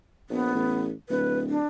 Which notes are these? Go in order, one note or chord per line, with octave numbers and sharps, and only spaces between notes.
A#1 B3
A1
D1 B4
D4